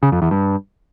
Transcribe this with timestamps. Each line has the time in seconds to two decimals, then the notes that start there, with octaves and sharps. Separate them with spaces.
0.03 C#3
0.12 F2
0.22 E2
0.31 G2